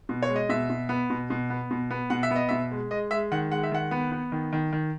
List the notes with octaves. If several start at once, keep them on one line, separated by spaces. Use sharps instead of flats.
B2
C#5
G#3
D#5
B2 E5
B2
B3
B2
B2
B3
B2
B3
B2 F#5
E5
B3 D#5
B2 E5
G#3
G#3 D#5
G#3 E5
D#3 F#5
G#3 F#5
E5
D#3 F#5
B3
B3
D#3
D#3
D#3